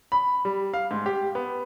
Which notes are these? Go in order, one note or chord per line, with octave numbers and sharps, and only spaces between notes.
B5
G3
F5
G#2
G4
B3